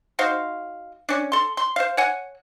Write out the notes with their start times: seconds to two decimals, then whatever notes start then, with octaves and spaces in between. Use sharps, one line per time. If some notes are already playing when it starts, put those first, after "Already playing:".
0.19 D#4 F#4 C5 F5
1.09 C#4 D4
1.32 A4 C6
1.57 C6
1.76 C5 F5
1.97 C#5 F#5 G#5